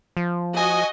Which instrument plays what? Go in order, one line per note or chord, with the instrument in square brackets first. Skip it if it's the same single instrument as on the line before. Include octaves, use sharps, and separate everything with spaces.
[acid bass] F3
[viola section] F#4 D#5 [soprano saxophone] G#5